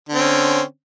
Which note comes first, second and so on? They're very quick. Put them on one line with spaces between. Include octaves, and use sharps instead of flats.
D3 C4 C#4